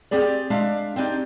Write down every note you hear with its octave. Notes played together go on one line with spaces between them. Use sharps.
C4 G4 G#4 D5
G#3 D4 E5 F5
C4 D4 D#4 G4